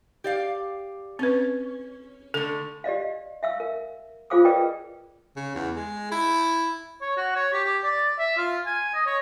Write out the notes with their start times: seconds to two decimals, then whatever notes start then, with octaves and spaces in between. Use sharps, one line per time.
0.24 G4 D5 F5
1.19 C4 C#4 B4
2.34 D3 A3 A4
2.84 G4 D5 D#5 F5
3.43 E5 F5 E6
3.60 A#4
4.30 F4 G#4 C5 F5 D6 D#6
4.45 G#4 A#4 B4 D5 D#5 G5
5.36 C#3
5.55 E2
5.76 G#3
6.11 E4
7.01 C#5
7.17 F#4
7.35 C#5
7.53 G4
7.64 G4
7.84 D5
8.19 E5
8.37 F4
8.66 G#5
8.94 D#5
9.06 C#5